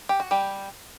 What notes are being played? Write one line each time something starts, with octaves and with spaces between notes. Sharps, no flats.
G4
F#4
G3 G4